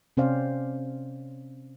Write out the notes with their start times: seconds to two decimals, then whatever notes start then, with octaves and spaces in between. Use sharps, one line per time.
0.17 C3 C4 C#4 C5 D5 F5